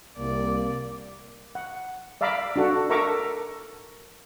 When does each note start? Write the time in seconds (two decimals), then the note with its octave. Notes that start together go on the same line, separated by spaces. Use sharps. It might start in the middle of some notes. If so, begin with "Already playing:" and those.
0.18 C2 A#3 D5
1.55 F#5
2.21 D5 E5 F5 A#5 B5 D6
2.56 D4 F#4 A4 F#5
2.90 A4 A#4 E5 A#5 C#6 D6